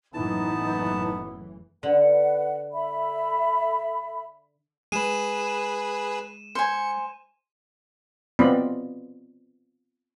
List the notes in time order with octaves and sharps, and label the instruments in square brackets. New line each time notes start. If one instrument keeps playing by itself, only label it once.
[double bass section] F#1 A2 E3 [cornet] B3 [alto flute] D#4 [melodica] A5
[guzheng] D3 [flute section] B4 F#5
[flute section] A4 E5 B5
[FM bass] G#3 [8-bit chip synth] G#4 B4 [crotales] D#7 E7
[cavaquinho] C5 G#5 [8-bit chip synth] C#7
[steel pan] B3 C4 F4 D5 D#5 B5